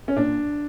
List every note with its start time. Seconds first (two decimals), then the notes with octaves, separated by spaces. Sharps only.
0.08 C#4
0.16 A#2 D4